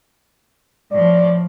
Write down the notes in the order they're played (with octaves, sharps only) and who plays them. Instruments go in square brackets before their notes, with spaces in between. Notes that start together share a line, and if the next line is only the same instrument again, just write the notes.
[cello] A2 F3 [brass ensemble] D5